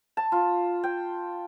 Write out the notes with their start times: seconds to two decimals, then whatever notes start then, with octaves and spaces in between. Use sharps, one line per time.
0.17 A5
0.32 F4
0.83 G5